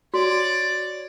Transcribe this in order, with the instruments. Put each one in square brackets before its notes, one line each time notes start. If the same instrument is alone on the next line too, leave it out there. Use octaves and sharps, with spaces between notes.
[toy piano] F#4 [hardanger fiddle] C#5 D5